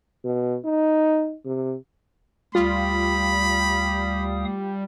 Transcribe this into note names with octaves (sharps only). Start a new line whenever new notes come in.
B2
D#4
C3
D2 G3 F4 F5 B5 D#6